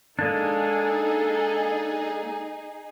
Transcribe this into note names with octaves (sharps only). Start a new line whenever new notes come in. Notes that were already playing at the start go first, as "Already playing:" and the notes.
G#3 A#3 D4 D#4 G#4 A4